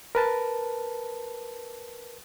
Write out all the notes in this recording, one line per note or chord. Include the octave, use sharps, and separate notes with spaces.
A#4 B4 A5